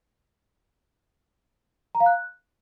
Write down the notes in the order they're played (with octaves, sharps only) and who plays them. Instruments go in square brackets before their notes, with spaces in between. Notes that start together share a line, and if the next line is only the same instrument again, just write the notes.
[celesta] A#5
F5
F#6